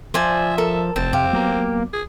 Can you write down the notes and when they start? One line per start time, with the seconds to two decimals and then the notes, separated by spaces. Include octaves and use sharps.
0.14 F3 C5 D5 E5 G#5
0.58 A4 A#4
0.96 F1 C4 A5
1.13 F2 C3 G4 F5
1.33 F#3 A#3 B3
1.93 G#4